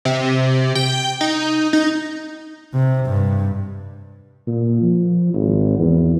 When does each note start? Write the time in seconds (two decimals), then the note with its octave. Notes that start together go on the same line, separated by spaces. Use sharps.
0.05 C3
0.75 G5
1.21 D#4
1.73 D#4
2.74 C3
3.06 G2
4.47 A#2
4.82 F3
5.34 G#1
5.78 E2